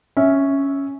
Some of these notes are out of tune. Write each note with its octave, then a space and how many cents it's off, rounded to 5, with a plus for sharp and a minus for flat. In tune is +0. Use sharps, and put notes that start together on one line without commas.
C#4 +0 E5 -10